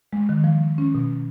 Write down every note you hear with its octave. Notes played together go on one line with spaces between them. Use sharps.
G#3
D#3
F3
C#4
B2